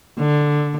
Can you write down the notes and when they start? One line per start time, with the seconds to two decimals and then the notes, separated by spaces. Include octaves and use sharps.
0.18 D3